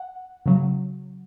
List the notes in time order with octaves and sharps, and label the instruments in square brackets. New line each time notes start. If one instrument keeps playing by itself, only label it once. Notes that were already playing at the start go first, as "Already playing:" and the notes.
Already playing: [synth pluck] F#5
C#3 F#3